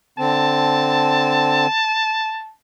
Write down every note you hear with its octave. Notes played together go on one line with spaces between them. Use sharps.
D3 C4 A5